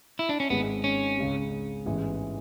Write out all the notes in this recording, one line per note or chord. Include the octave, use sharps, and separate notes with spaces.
E4
D4
C#4
G#1 G#2 G#3 B3
C#4
C#2 C#3 G#3
A1 G#2 E3 G#3 B3